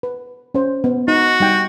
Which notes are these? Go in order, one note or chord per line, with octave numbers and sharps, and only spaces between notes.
B4
C#4 C5
B3
D#4 F#4
G3 D#4 G5